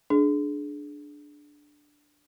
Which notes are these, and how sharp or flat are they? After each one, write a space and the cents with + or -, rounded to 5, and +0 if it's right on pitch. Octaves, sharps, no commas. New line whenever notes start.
D4 +0 G#4 +25